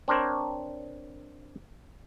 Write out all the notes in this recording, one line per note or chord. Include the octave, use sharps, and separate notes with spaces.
C4 D4 A#4 C5 C#5